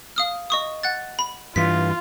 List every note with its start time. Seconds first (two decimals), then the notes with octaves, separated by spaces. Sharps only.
0.16 F5 D#6 F6
0.50 D#5 C#6 D#6
0.83 F#5 F#6 A6
1.19 B5
1.56 G2 E3 F4 B6